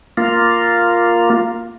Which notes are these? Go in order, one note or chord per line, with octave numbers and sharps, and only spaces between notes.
A#3 F4